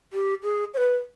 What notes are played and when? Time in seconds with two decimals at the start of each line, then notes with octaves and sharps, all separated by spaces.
0.13 G4
0.43 G#4
0.74 C#5
0.77 B4